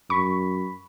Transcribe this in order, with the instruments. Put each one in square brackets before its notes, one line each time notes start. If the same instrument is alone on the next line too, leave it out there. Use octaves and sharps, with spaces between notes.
[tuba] F#2 [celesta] B5 B6 [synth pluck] C#6